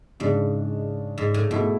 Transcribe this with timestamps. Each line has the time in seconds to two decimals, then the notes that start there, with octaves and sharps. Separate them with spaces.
0.20 G#2 C#3 G#3 D4
1.18 G#2
1.34 A2
1.51 G#2 B2 A3 E4 A4